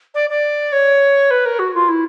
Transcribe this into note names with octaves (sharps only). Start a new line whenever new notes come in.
D5
D5
C#5
B4
A#4
F#4
F4
E4